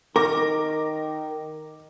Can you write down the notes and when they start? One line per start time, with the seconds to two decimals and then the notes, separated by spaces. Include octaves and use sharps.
0.16 D#3 A#4 D6 A#6